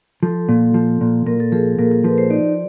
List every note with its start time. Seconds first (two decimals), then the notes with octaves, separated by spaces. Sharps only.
0.23 F3 A4
0.49 A#2
0.74 F3
1.01 A#2
1.26 A#2 A#4
1.40 A4
1.52 F3 G#4
1.79 A#2 A#4
1.91 A#4
2.04 F3 B4
2.18 C5
2.30 D#4 D5